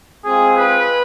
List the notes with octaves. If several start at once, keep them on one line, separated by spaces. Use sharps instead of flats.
G#3 C4 F4 G#4
B4